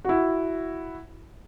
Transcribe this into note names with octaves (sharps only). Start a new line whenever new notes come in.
E4 F#4